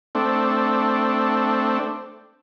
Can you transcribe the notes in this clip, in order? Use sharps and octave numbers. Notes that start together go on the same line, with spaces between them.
A3 C4 D4